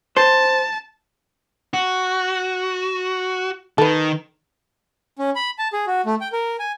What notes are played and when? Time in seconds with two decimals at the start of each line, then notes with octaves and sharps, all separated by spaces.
0.17 C5 A5
1.74 F#4
3.78 D#3 A4 B4
5.19 C#4
5.35 B5
5.58 A5
5.73 G#4
5.87 F#4
6.06 A3
6.21 G5
6.32 A#4
6.60 G#5